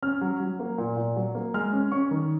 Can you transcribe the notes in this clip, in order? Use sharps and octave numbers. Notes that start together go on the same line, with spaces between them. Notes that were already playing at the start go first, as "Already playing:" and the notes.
C#4 F6
F#3
F#3
A#3
A#2
A#2
F#3
A#3
G#3 F6
C#4
C#4 C#6
D#3